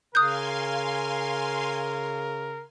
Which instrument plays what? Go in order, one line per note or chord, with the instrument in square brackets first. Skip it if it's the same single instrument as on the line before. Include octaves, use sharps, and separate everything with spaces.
[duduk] C#3 [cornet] A#4 [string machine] F5 G#5 C6 [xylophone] D#6 F#6 G6